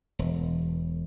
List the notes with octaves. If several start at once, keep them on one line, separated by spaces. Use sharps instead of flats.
E1